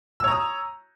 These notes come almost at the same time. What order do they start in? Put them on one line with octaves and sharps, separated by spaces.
E6 C#5 A#5 D#6